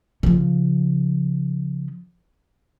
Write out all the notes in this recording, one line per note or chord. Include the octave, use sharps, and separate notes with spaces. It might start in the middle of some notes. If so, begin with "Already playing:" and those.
C#3 F3